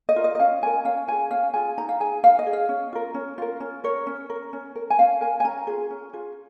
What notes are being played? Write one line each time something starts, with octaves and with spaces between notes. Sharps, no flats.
D#5
F4 A#4
D#5
D#5
C#4 F5
F4 A#4 G#5
C#4 F5
F4 G#4 G#5
C#4 F5
F4 G#4 G#5
D#4 A#5
F5
G#4 G#5
D#4 F5
D#5
G#4
F5
C#4
F4 A#4
C#4
F4 A#4
C#4
A#4 C#5
C#4
A#4
C#4
A#4
G#5
C#4 F5
A#4 G#5
G#5
C#4 A#5
F4 G#4
C#4
F4 G#4